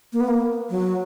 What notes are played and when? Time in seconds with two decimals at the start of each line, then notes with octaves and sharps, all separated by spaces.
0.13 A#3
0.20 B3
0.27 A#3
0.70 F#3